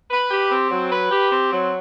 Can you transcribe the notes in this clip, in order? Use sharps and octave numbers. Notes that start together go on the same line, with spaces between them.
B4
G4
C4
F#3
B4
G4
C4
F#3